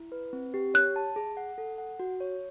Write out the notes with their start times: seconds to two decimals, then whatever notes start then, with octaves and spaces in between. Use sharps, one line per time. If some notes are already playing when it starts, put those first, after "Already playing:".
Already playing: E4
0.12 B4
0.33 C4
0.54 G4
0.74 C#5 F#6
0.96 A5
1.16 G#4
1.37 F#5
1.58 A4
1.78 F#5
2.00 F#4
2.21 C#5